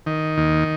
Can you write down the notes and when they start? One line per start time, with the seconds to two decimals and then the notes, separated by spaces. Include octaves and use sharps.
0.06 D#3
0.37 D#2